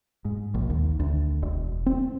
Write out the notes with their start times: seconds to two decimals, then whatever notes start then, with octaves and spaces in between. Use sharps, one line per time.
0.25 G#2
0.54 A#1
0.70 D#2
1.00 D2
1.43 E1
1.86 C4